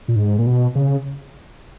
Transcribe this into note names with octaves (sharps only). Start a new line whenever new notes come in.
A#2
G#2
A#2
B2
C#3